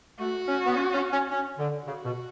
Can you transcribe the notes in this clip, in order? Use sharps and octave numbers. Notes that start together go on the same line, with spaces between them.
A3 F#4
C#4
B3
C#4
C#4
C#4
C#4
D3
C#3 F#4
B2